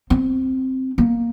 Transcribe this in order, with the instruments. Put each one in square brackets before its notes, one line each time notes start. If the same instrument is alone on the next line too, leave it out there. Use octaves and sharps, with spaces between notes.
[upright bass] C4
A#3